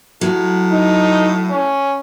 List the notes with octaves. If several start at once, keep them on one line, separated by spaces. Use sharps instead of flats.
A2 F#3
D#4
C#4